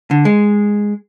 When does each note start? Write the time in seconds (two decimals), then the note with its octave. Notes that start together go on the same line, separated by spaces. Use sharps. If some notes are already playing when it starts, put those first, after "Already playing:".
0.11 D3
0.25 G#3